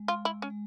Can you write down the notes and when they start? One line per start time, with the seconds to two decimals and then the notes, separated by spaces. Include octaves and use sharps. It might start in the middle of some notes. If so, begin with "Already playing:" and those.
Already playing: G#3
0.08 F4
0.25 E4
0.42 C#4
0.50 G#3